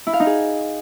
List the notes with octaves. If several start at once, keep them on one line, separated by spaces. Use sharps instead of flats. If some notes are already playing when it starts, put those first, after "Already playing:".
E4
F5
D#4
G#4